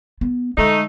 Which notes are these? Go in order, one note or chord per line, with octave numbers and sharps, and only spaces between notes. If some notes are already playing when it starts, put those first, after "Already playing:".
B3
D3 G#3 A3 D#4